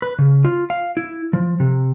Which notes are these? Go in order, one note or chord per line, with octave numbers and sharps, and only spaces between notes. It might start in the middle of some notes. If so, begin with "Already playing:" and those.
B4
C#3
F4
F5
E4
F3
C3